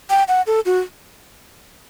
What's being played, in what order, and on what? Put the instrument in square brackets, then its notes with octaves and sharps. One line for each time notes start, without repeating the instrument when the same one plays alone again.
[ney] G5
F#5
A4
F#4